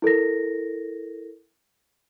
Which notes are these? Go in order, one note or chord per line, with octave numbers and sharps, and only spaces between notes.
E4 A4 A#4 A#6